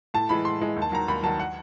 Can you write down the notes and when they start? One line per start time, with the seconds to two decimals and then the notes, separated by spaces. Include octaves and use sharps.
0.14 A2 A5
0.29 E3 G#3 B5
0.45 A2 C6
0.61 E3 G#3
0.76 D#2
0.82 A5
0.92 D#3 F#3 A#5
1.08 D#2 B5
1.23 D#3 F#3 A5
1.40 F#5